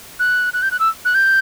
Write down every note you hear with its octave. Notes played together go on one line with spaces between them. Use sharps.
F#6
F#6
G6
F#6
E6
F#6
G6